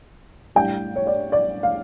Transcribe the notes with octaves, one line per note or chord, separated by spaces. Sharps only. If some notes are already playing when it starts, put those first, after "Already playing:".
A2 G3 D4 G5
C#5
D5
D5
F5